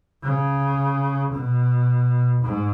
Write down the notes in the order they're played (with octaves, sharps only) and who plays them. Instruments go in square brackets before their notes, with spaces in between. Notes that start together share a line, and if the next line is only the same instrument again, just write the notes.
[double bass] C#3
B2
G#2